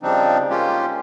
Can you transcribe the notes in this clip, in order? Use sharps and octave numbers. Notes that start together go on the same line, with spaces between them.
C#3 F3 G3 C4 D4 D#4
G#3 A#3 C#4 F4 G4